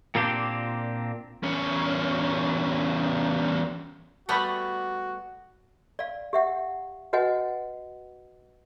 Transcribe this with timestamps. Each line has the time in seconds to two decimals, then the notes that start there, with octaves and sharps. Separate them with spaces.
0.15 A#2 A#3 C4 D4 G4
1.43 E2 C#4
4.29 G3 A3 B3 F#4 A5 B5
5.99 D5 F5
6.33 G4 E5 F#5
7.13 F#4 B4 D#5 F#5 G#5